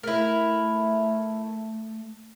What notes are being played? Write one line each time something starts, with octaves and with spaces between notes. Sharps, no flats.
A3 E4 A#4